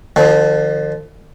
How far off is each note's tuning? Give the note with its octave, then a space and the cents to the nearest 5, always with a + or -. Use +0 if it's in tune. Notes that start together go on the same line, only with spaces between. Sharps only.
D3 +45 F3 +0